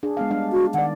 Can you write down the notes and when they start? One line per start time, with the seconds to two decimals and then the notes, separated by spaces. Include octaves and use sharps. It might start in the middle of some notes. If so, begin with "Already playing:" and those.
0.03 D4 G#4
0.17 G#3 B3 F5
0.30 G3 D4 F5
0.52 F#4
0.74 D#3 D5 F#5